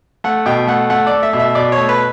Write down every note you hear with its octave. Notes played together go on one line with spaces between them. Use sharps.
A3 F#5
B2 G5
A3 F#5
A3 F#5
A3 D5
E5
B2
E5
B2 D5
C#5
A3
B4